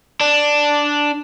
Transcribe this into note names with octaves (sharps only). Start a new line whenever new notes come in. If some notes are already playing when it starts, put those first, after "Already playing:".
D4